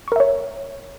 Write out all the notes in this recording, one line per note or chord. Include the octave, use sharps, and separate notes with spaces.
A#4 C#5 E5 C#6